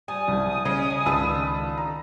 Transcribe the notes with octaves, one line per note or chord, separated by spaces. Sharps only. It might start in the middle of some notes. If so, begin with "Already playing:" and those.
G3 G#5 D#6
C2
C#3 D#5
G#5
C#2 D3 D#3 A5 B5 E6
A#5